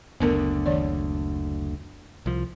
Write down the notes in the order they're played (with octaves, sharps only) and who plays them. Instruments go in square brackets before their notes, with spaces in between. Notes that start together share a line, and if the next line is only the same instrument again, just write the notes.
[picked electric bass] F#1 D2 D3 [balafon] B3 A#4
[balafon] D#3 D5
[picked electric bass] C2 F3